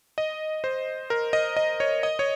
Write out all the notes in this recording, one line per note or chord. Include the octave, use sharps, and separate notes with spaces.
D#5
C5
A#4
D#5
D#5
C#5
D#5
C#5